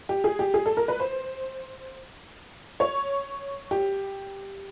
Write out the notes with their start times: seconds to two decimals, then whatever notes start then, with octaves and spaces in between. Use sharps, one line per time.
0.09 G4
0.24 G#4
0.39 G4
0.54 G#4
0.66 A4
0.77 A#4
0.88 B4
1.00 C5
2.80 C#5
3.71 G4